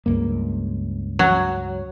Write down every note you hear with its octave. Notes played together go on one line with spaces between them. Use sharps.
C#2 G2 A#3
F#3